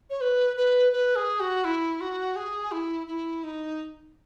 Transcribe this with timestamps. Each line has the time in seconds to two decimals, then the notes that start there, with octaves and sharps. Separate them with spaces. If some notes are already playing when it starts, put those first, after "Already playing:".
0.09 C#5
0.20 B4
0.56 B4
0.92 B4
1.15 G#4
1.39 F#4
1.64 E4
2.00 F#4
2.35 G#4
2.71 E4
3.07 E4
3.43 D#4